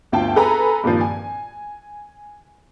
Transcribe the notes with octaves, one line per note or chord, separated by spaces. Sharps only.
G1 D2 F4 G5 A5
G#4 A4 B4 G#5 A#5 B5
G2 A#2 D#3 F3
G#5